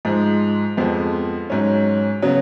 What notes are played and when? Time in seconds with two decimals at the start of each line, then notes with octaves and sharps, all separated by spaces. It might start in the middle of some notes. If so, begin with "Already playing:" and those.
0.05 G#2 F3 G#3
0.77 F2 F3 G#3 B3
1.50 G#2 F#3 C#4
2.22 C#3 F#3 B3